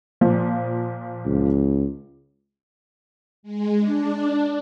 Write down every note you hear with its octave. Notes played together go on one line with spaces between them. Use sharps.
A#2 F3
C#2
G#3
D4